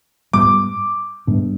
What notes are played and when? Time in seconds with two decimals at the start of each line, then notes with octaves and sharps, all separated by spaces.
0.33 G#2 G3 B3 D6
1.27 G#2 G3 B3 D4